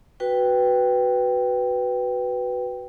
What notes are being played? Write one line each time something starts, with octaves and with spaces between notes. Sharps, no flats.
F#4 B4 G5